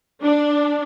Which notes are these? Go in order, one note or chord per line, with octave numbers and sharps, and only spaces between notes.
D4